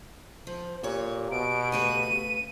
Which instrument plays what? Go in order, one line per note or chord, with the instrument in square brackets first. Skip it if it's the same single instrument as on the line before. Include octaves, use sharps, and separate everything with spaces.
[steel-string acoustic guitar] F3 [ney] C5
[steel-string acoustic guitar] F2 C#5 [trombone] A#2 [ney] G4
[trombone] B2 [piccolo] D7
[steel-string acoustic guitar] C#3 A3 B4 [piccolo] D#7